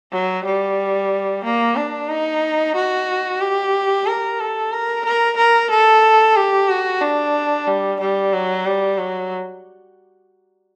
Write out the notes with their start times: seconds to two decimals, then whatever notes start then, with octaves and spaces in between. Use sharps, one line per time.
0.12 F#3
0.45 G3
1.44 A#3
1.76 D4
2.09 D#4
2.76 F#4
3.41 G4
4.06 A#4
4.40 A4
4.73 A#4
5.05 A#4
5.37 A#4
5.71 A4
6.36 G4
6.69 F#4
7.01 D4
7.67 G3
8.00 G3
8.33 F#3
8.66 G3
8.98 F#3